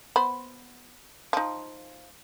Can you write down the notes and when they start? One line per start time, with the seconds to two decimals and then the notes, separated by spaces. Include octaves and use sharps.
0.16 B3 C5 B5
1.33 F3 D#4